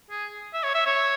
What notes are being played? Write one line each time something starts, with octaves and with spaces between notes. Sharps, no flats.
G#4
E5
C#5
E5
C#5